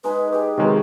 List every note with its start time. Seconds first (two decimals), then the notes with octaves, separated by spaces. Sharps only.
0.04 G#3 D#4 G#4 B4
0.32 G4 G#4 B4
0.58 C3 D#3 F#3 G#3 B3